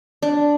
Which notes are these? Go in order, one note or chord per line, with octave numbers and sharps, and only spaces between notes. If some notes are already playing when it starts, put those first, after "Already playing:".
D4